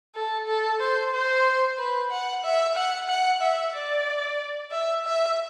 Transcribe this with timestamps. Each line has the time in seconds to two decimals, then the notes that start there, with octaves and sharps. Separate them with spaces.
0.15 A4
0.47 A4
0.80 C5
1.13 C5
1.78 B4
2.11 F#5
2.44 E5
2.75 F#5
3.08 F#5
3.41 E5
3.73 D5
4.71 E5
5.04 E5